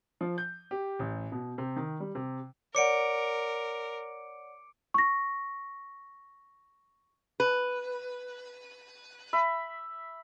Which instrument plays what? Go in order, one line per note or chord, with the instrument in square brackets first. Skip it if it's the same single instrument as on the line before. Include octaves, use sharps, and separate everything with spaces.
[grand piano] F3
G6
G4
A1
B2
C3
D#3
G3
C3
[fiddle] A#4 [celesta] C#5 D5 F#5 [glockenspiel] D6 C#7 D7
[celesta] C#6 A#6
[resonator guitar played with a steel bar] B4
[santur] E5 B5